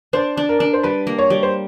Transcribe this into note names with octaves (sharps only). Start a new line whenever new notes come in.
D4 C5
D4
A#4
D4
C5
G3 B4
A#3
C#5
G3
C5